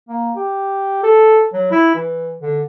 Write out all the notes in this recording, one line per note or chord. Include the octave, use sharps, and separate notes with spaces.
A#3
G4
A4
F#3
E4
E3
D3